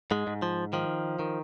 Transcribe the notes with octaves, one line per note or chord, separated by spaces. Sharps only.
G#2 G#3
G#2
F3
D#3 F3
D#3